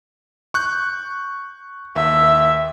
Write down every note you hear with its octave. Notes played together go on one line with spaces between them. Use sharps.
C#6 F#6 G6
D#2 E5